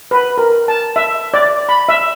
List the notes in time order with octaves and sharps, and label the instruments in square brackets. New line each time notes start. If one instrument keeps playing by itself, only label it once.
[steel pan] B4
A#4
A5
E5
D5
B5
E5